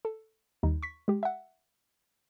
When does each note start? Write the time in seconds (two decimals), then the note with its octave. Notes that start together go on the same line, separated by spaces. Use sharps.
0.05 A4
0.63 D#2 G3 D#4
0.83 C#6 B6
1.08 G#3 G4
1.23 E5 F#5